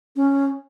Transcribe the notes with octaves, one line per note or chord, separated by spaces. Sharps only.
C#4